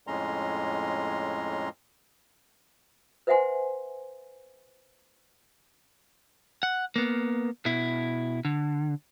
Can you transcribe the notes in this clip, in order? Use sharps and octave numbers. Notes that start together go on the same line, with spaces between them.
F2 A2 G#3 C#4 A#5 C6
B4 C5 E5 F#5 G#5 C6
F#5
A#3 B3
B2 E4
D3